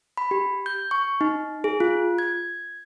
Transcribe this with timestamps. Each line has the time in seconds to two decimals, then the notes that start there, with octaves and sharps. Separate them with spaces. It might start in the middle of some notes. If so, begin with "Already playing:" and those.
0.17 B5
0.31 G4
0.66 G6
0.91 C#6
1.21 D#4
1.64 G#4
1.80 F4
2.18 G#6